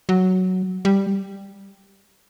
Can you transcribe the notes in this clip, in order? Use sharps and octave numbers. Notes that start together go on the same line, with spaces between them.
F#3
G3